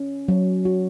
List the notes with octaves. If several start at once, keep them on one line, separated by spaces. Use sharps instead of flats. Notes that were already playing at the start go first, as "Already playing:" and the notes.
Already playing: C#4
F#3
F#4